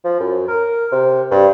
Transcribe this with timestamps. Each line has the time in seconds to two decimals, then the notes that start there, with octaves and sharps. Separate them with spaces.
0.04 F3
0.20 F#2
0.48 A#4
0.92 C3
1.31 G2